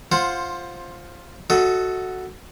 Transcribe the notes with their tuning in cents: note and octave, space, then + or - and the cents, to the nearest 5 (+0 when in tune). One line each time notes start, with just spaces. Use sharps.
F4 +0 C5 +15 F#5 -15
F#4 +0 A4 +0 D#5 +35